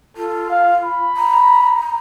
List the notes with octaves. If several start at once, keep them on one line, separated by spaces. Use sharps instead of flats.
F4 A4
F5
B5
A#5